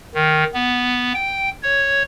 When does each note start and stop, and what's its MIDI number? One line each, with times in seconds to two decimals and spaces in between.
0.14 0.44 51
0.54 1.13 59
1.15 1.50 79
1.63 2.03 73